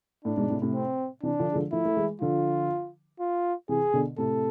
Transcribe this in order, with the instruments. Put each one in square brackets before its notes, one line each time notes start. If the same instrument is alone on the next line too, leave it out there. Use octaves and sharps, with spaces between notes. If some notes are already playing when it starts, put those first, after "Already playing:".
[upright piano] A2 [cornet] D4
[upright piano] G#2 B2
A2 C3
A2 C3
[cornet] C4
[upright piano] C3 E3 [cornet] D4
[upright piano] D3 F3
G#3
D3 F3
[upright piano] F3 A3 [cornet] E4
[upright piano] A3
E3 G#3
[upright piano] D3 F3 [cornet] F4
[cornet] F4
[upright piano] C3 E3 [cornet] G#4
[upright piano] B2 D3
[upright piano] A2 C3 [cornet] A4